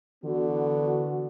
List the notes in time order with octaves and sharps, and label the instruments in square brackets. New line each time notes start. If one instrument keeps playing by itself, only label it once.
[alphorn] D3 [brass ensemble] E3 B3 F#4